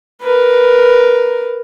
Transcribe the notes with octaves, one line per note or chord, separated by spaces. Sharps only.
A#4 B4